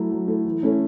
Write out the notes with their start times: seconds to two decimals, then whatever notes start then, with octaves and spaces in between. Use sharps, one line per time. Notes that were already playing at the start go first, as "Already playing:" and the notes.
Already playing: F#3 A3 E4
0.11 F#3
0.27 A3 E4
0.45 E3
0.62 A3 C#4 E4